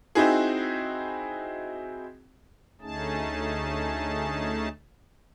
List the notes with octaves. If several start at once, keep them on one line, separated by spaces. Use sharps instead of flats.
C4 D#4 E4 F#4 G#4
D2 A3 C#4 D#4 G#4 A5